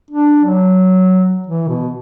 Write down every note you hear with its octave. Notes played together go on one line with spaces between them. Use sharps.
D4
F#3
E3
B2